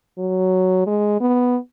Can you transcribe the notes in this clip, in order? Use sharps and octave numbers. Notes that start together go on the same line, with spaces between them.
F#3
G#3
B3